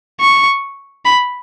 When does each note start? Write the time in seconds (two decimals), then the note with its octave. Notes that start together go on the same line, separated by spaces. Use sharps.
0.21 C#6
1.05 B5